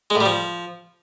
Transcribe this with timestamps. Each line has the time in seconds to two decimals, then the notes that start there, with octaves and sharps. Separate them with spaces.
0.10 G#3
0.15 A2
0.20 G3
0.26 F3